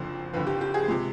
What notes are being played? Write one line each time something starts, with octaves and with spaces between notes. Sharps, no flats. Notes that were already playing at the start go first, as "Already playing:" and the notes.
Already playing: F#1 F2 D3 C5
F#1 F2 D3 B4
G4
G4
G#4
C3 F3 G#3